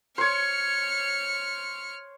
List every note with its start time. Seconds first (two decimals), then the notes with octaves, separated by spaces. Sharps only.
0.18 C5 C#5 F6 C#7